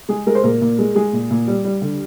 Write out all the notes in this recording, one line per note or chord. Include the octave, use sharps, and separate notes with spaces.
G#3 G#4
G#3 A#4
C5
A#2 A#4
A#2
G#3
G#3 G#4
A#2
A#2
G3
G3
D3